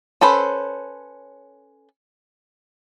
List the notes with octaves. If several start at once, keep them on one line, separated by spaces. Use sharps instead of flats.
C#4 A4 B4 C5